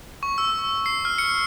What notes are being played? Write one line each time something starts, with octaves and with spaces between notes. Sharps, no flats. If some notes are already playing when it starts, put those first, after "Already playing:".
C#6
E6
C7
F6
C#7